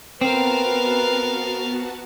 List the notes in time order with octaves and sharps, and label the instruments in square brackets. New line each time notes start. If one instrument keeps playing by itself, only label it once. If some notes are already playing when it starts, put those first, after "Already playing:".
[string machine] B3 F#4 A5 [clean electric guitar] C4 [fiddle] A#4 F5 [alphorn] B4